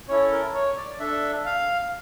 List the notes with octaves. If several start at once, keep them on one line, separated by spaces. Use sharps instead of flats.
C#4 E4 A4 C#5
A#4
C#5
D5
D4 A4 E5
F5